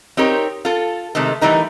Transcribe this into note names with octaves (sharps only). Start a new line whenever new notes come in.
C4 D#4 G4 A#4 C#5
F4 A4
C3 D#3 G#3 A3
E3 G3 A3 D#4 A#4